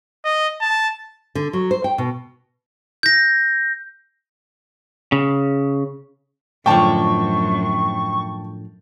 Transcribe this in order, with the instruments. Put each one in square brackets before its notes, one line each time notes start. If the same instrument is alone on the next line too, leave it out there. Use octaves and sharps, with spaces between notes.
[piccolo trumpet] D#5
A5
[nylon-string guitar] D3
F#3
C5
G5
B2
[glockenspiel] G6 A#6
[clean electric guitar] C#3
[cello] F#2 [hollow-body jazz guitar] A2 D3 F3 [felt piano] G5 A5 [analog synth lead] C#6